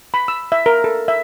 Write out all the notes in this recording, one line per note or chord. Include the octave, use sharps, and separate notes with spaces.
B5
E6
E5
A#4
A4
E5